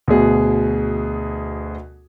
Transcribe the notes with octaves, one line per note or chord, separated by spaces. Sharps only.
D2 B2 G#4